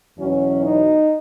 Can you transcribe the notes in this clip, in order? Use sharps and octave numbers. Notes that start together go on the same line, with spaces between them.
E2 B2 F#3 C#4
D#4